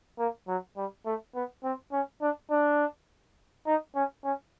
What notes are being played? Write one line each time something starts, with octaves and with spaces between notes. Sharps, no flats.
A#3
F#3
G3
A3
B3
C4
C#4
D4
D4
D#4
C#4
C#4